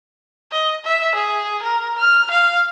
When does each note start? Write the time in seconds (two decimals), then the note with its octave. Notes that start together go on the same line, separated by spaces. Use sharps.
0.51 D#5
0.85 E5
1.15 G#4
1.62 A#4
1.98 F6
2.31 F5